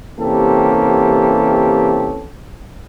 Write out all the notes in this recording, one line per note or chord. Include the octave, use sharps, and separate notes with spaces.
C3 E3 A#3 C#4 G4 A4